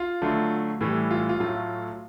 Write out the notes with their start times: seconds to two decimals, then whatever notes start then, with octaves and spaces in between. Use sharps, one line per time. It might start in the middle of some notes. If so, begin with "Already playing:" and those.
Already playing: F4
0.22 D3 F#3 A3
0.81 A2 E3 G3
1.11 F4
1.29 F4
1.39 A2 F#3 A3 F4